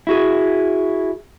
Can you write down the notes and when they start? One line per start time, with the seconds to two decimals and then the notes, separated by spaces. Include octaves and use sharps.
0.07 E4 F#4 G#4